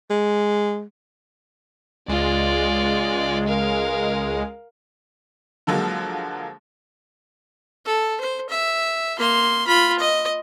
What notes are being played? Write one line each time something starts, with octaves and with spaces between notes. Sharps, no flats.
G#3
C#2 G#3 F4 D5
A#4 F5
D3 F3 F#3 G#3 A#3
A4
C5
E5
A#3 C6
F4 B5
D#5